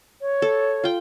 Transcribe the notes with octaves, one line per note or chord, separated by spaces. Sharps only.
C#5
A4
F4 G5